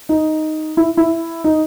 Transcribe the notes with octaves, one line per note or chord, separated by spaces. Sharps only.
D#4
E4
E4
D#4